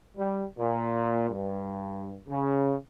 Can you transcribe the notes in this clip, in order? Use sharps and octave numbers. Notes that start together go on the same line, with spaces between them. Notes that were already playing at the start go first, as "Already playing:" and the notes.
G3
A#2
G2
C#3